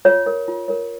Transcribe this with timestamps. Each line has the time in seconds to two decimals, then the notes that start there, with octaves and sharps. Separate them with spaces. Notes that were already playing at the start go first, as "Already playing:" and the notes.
0.05 F4 C#5
0.26 A#4 C#5
0.48 F4
0.68 A#4 C#5